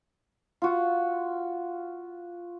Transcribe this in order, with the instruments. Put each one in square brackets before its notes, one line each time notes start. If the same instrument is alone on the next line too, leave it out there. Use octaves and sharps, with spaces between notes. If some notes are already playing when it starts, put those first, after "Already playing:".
[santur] F4 F#4